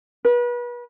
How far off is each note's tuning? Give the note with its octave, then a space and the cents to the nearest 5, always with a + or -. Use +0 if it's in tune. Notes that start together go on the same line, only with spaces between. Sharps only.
B4 -35